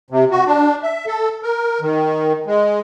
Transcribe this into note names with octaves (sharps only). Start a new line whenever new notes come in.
C3
F#4
D4
E5
A4
A#4
D#3
G#3